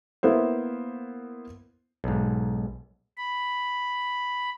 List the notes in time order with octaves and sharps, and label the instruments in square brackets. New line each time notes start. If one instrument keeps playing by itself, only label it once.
[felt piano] A#3 B3 E4 C5
[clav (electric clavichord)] B1 G#2
[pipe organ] B5